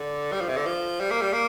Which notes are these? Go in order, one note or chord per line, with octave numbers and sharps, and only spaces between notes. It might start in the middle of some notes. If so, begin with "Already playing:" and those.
Already playing: D3
G3
F3
C3
D3
F3
G3
A#3
G3
A#3